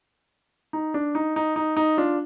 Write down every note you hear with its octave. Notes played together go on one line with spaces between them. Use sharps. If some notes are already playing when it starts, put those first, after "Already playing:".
D#4
D4
D#4
D#4
D#4
D#4
D4 F4